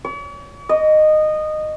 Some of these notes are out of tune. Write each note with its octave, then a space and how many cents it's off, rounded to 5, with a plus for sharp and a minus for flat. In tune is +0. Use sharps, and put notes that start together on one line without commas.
C#5 +45
D#5 -15